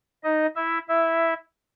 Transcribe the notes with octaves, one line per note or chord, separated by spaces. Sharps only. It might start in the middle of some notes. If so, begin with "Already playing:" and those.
D#4 D#5
E4 E5
E4 E5